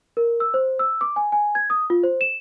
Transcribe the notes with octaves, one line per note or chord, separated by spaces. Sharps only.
A#4
E6
C5
E6
D6
G#5
G#5
G#6
D#6
F4
C5
E7